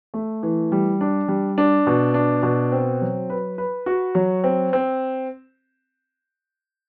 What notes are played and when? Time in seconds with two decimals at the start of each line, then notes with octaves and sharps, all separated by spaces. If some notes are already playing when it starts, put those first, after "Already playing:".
0.14 A3
0.43 E3
0.72 G3
1.01 D4
1.28 G3
1.58 D4
1.87 B2
2.14 D4
2.43 B2
2.72 C4
3.01 F#3
3.30 B4
3.58 B4
3.86 F#4
4.15 F#3
4.44 C4
4.73 C4